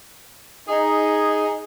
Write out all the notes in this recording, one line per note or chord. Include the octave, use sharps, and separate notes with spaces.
D#4 G#4